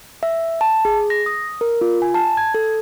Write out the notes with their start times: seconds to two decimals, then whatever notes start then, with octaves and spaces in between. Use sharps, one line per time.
0.23 E5
0.61 A5
0.85 G#4
1.10 A#6
1.26 D#6
1.61 A#4
1.81 F4
2.02 G#5
2.14 A5
2.37 G#6
2.54 A4